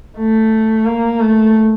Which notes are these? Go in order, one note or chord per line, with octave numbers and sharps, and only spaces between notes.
A3
A#3
A3